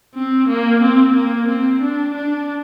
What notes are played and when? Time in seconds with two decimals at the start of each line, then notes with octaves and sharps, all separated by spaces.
0.15 C4
0.48 A#3
0.82 C4
1.15 A#3
1.49 C4
1.82 D4
2.15 D4